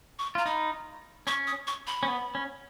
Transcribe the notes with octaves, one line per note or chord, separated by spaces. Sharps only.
C#6
F4 A#5
D#4 B5
C#4 C#6
D#6
C#6
B5
C#4
B3
C#4